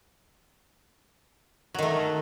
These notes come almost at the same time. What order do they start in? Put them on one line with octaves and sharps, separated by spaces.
F#3 D#3 A3